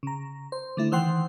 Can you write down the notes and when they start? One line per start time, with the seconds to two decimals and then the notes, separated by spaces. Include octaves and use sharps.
0.03 C#3 A#5
0.52 C5
0.77 D3 A3 E4
0.92 D#3 E3 C5 F#5 G5 C6